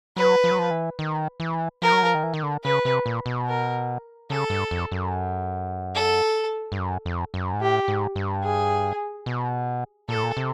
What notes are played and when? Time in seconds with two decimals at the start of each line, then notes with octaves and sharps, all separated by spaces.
0.16 F#3 B4
0.44 F3
0.51 F#3
0.59 F3
0.71 E3
0.99 D#3
1.40 E3
1.82 F3 A#4
1.92 F#3
2.03 F3
2.15 D#3
2.23 E3
2.34 D#3
2.43 D3
2.64 C#3 B4
2.85 C3
3.06 A#2
3.26 B2
3.47 A#4
4.30 C#3 A4
4.50 G2
4.71 F2
4.91 F#2
5.95 A4
6.72 G2
6.79 F#2
7.06 F2
7.34 F#2
7.54 G#2
7.60 A2 G4
7.88 G#2
8.16 G2
8.43 G#4
9.26 B2
10.09 A#2 A4
10.16 A2
10.23 A#2
10.37 C3